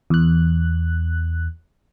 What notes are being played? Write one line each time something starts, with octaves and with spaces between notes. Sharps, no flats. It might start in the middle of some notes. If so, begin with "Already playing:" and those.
E2 F#6